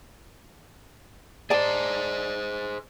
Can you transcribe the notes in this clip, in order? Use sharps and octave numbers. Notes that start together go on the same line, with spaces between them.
G#4 C5 D5 A5